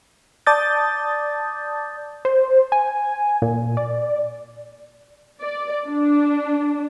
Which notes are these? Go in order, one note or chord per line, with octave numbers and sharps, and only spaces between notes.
D5 A5 D6 D#6 G6 A6
C5
G#5
A#2
D5
D5
D4